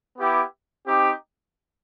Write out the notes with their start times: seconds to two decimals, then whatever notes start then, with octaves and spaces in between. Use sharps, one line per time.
0.17 B3 E4 G4
0.86 C4 D#4 G4